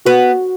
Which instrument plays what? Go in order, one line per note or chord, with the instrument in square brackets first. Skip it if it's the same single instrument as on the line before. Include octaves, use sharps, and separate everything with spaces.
[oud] B3 [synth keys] F#4